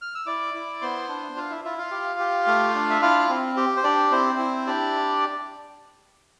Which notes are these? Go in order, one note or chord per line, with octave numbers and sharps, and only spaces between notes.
F6
E6
E4 D5 D6
E4
B3 C5 C6
D4
F4 F5
E4 E5
E4 F4 E5
F4 F5
G4
G4
A3
D4
E5
E4 F4 F5
C4
G4
C5
D4 G4 D5
C4 E4 C5
E4
D4 G4 D5